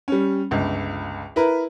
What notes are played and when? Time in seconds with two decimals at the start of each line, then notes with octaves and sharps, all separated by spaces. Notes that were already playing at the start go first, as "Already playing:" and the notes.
0.08 G3 C#4
0.51 G1 C#2
1.36 E4 A#4 B4